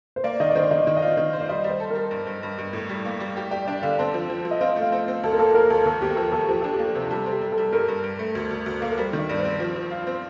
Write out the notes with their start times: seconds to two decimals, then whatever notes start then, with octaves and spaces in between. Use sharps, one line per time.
0.16 C5
0.24 A#3 D5
0.40 D#3 D#5
0.50 D5
0.55 D#3 C5
0.71 D#3 D#5
0.83 D#3 D5
0.97 D#5
1.02 F4
1.17 D#3
1.33 C5
1.41 D5
1.49 G3 D#5
1.64 G3
1.69 C5
1.80 A4
1.91 G3 A#4
2.11 G2
2.27 G2
2.43 G2
2.58 G2
2.73 A2
2.89 G3
3.05 A#3
3.20 G3
3.37 G4
3.51 G4 D5
3.67 D4 D5
3.82 D3 F5
3.99 C4 A5
4.14 F3
4.30 F3
4.45 F3
4.51 D#5
4.61 C4 F5
4.76 A3
4.82 F5
4.92 C4
5.08 C4
5.24 D2 A4
5.32 A#4
5.39 A#3 A4
5.54 A#3 A#4
5.70 D2 A4
5.85 D#2 A4
6.01 D#2 G4
6.17 F3 A4
6.32 D#2 A4
6.48 F3 G4
6.61 D4 A4
6.73 G4
6.79 A#3
6.95 C3
7.11 G3 A4
7.26 C4
7.32 G4
7.41 G3
7.52 A4
7.58 G3
7.73 G2 A#4
7.88 G2
8.04 G2
8.19 A3
8.35 D2
8.51 D2
8.66 D2
8.80 A#3 A4
8.90 A#4
8.98 G3 C5
9.13 D#3
9.19 D5
9.29 G2
9.39 C5
9.45 C4
9.60 F3
9.76 F3
9.91 F4
10.07 C4